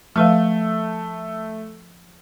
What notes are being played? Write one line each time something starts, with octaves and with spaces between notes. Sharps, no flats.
F3 A3 B4 F5